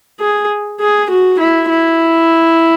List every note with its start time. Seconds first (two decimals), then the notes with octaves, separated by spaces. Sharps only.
0.20 G#4
0.80 G#4
1.10 F#4
1.39 E4
1.70 E4